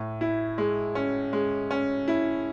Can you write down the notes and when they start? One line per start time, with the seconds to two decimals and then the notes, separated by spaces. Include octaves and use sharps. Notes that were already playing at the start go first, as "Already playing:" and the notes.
Already playing: A2
0.21 E4
0.58 G#3
0.95 C#4
1.33 G#3
1.71 C#4
2.08 E4